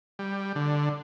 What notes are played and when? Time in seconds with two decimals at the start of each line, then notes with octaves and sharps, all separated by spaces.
0.19 G3
0.55 D3